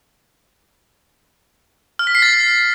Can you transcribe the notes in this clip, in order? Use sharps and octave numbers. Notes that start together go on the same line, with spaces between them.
F6
B6
C7
A6